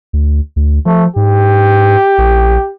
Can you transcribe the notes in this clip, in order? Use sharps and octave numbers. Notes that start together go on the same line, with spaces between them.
D2
D2
F3 A3
G#2 G4
A#1